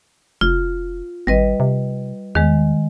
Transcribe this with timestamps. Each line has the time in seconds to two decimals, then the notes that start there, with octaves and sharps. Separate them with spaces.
0.41 F1 F4
1.27 G#1 G3 B4 D#5
1.60 C3
2.35 E2 D#3 G#3